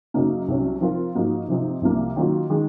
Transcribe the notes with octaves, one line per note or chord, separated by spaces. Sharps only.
F#2 C#3 F#3 A#3 D#4
C2 C3 F#3 C#4
F3 C4 F4 A#4
G#2 F3 A#3 D#4 F#4
C3 F3 C4 D#4
C2 C3 F3 A#3
D#3 F#3 A#3 F4
D#3 G#3